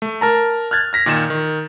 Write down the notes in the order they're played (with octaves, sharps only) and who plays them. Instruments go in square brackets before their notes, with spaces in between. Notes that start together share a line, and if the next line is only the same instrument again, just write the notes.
[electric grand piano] A3
A#4 A5 A#5
F6 F#6 G#6 A6
F6 A#6 B6
A#2 D#3 A6 E7
D#3